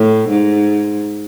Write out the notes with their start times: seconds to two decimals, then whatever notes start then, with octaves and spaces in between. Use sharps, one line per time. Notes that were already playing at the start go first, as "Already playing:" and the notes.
Already playing: A2
0.29 G#2